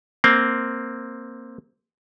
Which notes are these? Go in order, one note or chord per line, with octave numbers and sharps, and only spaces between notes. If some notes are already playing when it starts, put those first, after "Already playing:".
A#3 C4